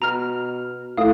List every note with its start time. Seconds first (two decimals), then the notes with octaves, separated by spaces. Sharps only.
0.02 B2 A#5 F6
0.97 A2 F5 D#6